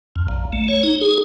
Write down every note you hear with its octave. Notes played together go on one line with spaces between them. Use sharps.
F2
A#1
A3
C#5
D#4
G#4